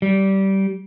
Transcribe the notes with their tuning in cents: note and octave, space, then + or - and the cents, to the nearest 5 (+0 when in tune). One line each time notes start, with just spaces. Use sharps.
G3 -20